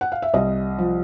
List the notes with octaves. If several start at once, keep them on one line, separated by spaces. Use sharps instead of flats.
F#5
F5
E5
C2 D#5
F3